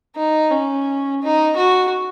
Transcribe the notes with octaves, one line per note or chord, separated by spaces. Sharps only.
D#4
C#4
D#4
F#4